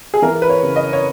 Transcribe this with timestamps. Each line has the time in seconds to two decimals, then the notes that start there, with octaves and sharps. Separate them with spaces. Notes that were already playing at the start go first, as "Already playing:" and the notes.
0.14 G#4
0.22 E3 A#4
0.42 B4
0.49 C#5
0.63 C#3
0.76 D#5
0.93 C#5